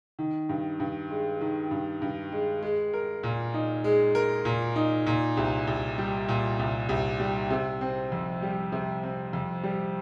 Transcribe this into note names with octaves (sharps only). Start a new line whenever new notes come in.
D#3
G2
G2
G#3
D#3
G2
G2
G#3
G#3
A#4
A#2
D#4
G#3
A#4
A#2
D#4
A#2
C2
C2
G3
A#2
C2
C2
G3
C3
C4
F2
G3
C3
C4
F2
G3